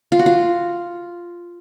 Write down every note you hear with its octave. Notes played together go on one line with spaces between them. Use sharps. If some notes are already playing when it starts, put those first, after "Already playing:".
F4
F#4
F4